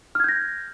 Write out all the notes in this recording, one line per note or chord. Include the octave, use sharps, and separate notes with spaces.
F6 G6 G#6 A#6